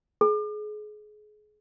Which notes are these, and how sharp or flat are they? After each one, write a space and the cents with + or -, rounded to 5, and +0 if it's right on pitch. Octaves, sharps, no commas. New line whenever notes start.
G#4 +30